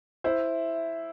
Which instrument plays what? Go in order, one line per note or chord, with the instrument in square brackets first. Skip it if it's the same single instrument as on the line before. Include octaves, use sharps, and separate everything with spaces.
[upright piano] E4 [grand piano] C5